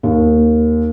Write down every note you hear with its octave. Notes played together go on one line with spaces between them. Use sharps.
D#2